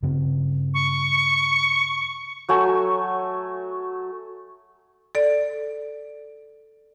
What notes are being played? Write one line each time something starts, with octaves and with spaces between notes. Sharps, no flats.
G2 C#3 C4
C#6
F#3 A3 G#5
A4 D5